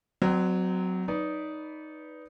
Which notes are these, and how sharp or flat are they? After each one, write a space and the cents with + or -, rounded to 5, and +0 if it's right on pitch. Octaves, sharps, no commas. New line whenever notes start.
F#3 +0 C4 -30 D5 +20
D#4 +0 B4 +0 D5 -25